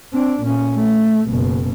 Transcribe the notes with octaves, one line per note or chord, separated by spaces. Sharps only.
C4 D4
A#2 C#4
A3
F#1 B2